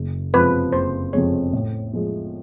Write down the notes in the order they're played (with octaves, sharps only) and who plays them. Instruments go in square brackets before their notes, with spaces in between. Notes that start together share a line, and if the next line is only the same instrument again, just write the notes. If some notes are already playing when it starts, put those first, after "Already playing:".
Already playing: [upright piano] F#1
[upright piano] F2 C3 F3 G#3 [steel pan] B4
[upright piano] F#1 [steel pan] C5
[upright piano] F2 C3 F3 G#3 [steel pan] C#5
[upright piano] A2
F3 G#3